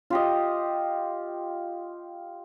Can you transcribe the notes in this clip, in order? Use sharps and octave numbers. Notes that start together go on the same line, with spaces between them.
F4 G4 D#5